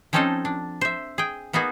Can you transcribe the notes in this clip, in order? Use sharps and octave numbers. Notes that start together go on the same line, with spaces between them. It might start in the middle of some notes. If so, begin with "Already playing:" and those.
F3 C4 C#4 D#4 A4 D#5
D4
C5 E5
G#4 G5
A#3 B3 D#4 F#4 G#4